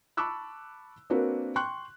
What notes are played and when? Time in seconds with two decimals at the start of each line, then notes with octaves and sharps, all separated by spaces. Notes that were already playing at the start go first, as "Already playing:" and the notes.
0.17 A5 B5 C#6 D6 E6 F#6
1.10 A#3 C4 D4 F#4 A#4 B4
1.56 G5 C6 C#6 F#6